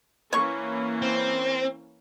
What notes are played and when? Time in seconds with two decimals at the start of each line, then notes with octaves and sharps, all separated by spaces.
0.33 E3 A#3 C#4 C#5 C#6
1.02 C4